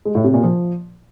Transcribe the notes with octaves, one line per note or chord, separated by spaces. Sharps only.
G#3
A2
C3
A#2
F3